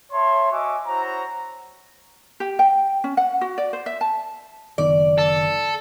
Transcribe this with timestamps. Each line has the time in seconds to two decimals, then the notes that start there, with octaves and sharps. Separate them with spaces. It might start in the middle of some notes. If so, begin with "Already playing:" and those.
0.12 C#5 E5 A5 C6
0.51 F#4 D#5 E5 G#5 C#6 D6
0.87 E4 F#4 C5 C#5 A#5
2.40 G4
2.59 G5
3.04 C#4
3.17 F#5
3.41 F#4
3.58 D5
3.73 C5
3.86 E5
4.01 A5
4.78 F#1 D#3 B3 D5
5.18 A4